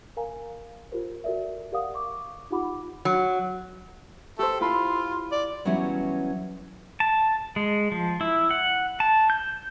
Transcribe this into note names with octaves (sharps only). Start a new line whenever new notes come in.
A#4 F5 G#5 A#5
F4 G4 A#4 C5
F#4 A4 A#4 D5 E5
G4 A#4 D5 F5 F#5 D#6
C#6 D6
D#4 F4 G4 F#5 B5 D6
F#3
G4 A4 C5
E4 F4 B5 C6
D5
E3 F#3 G3 B3 C#4 E4
A5
G#3
F3
E4
F#5
A5
G6